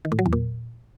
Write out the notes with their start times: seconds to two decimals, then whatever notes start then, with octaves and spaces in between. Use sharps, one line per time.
0.05 D#3
0.12 A2
0.19 F#3
0.26 E2
0.33 A#2